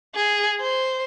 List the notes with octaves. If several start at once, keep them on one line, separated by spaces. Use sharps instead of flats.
G#4
C5